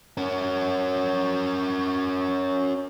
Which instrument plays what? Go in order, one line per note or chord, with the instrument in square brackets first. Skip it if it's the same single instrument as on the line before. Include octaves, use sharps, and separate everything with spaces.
[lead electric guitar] C#4 A#4